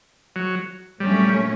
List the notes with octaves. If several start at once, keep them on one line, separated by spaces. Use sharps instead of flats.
F#3
A#2 F#3 G3 A3 C#4